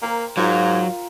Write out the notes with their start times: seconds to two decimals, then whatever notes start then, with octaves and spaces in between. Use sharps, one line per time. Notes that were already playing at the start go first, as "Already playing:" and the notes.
0.02 A#3 A#4 C5 G5
0.37 G#2 F#3 F4 A#4